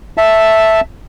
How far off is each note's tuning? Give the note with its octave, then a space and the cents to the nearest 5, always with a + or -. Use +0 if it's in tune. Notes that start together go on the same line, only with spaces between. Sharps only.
E5 +0 A5 +0